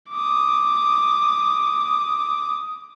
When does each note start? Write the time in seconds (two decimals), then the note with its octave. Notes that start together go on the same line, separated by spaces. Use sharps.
0.11 D6 D#6